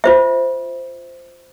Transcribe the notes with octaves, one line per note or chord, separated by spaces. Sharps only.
F4 C5 E5